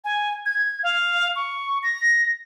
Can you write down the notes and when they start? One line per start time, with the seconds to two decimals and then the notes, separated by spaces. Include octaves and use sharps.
0.04 G#5
0.46 G#6
0.83 F5
1.36 C#6
1.83 A#6